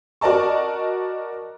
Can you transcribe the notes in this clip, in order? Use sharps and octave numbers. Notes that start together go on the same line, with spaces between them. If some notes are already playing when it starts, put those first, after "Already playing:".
F#4 A#4 D5 D#5 A5 C#6